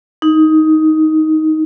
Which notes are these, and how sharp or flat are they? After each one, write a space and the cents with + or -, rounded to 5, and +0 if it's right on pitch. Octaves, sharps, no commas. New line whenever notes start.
D#4 +10